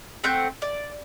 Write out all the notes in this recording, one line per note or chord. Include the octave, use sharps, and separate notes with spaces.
A3 C4 F#5 G6
D5